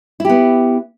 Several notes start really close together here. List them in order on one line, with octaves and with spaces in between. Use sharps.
E4 G4 B3